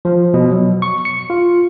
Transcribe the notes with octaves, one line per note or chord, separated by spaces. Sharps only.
F3
B2
F#3
C#6
C#7
F4